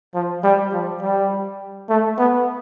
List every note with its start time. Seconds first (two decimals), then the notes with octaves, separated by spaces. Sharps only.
0.14 F3
0.43 G3
0.73 F3
1.02 G3
1.89 A3
2.18 B3